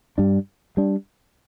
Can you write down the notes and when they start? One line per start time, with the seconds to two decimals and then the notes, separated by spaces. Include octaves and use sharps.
0.18 G2 G3 D4
0.77 G3 D4